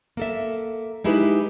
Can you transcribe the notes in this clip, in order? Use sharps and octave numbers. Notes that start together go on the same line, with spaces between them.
A#3 A4 E5
G#3 D#4 E4 G4 G#4 B4